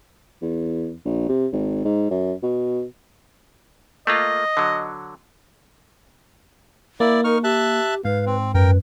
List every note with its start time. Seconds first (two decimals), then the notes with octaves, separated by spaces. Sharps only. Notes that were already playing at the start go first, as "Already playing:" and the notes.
0.42 E2
1.05 A#1
1.28 C3
1.52 G#1
1.85 G#2
2.11 F#2
2.43 B2
4.07 A3 A#3 F4 D#5
4.57 D3 F#3
7.00 A#3 E4 D5
7.24 D#4 A#4 C#6 F6
7.44 G4 E5 A5 F#6
8.05 G#2 B4 F5
8.26 C4
8.54 F#2 A#4 B4 G5